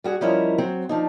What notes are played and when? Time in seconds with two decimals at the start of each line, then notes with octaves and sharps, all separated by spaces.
0.04 G3 F#4 G#4
0.21 F3 G3 C#4 E4 A#4 D#5
0.58 F#3 C4
0.89 F3 D4 D#4